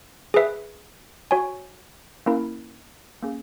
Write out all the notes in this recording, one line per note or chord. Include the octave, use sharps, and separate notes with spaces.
G#4 B4 E5
F#4 C#5 G#5
A#3 C#4 E4 A#4
A#3 C#4 G#4